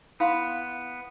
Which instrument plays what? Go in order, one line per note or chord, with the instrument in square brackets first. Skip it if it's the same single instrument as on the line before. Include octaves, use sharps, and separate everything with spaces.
[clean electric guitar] B3 [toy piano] E4 F5 C6